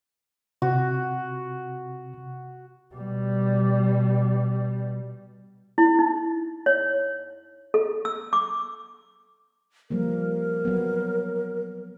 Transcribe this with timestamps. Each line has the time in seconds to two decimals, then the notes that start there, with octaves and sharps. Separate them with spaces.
0.62 C3 F#4
2.95 B2 G3
5.78 E4
5.99 D#4
6.66 C#5
7.74 A4
8.05 E6
8.33 D6
9.90 F3 G3 A#3 A#4
10.65 F#3 B3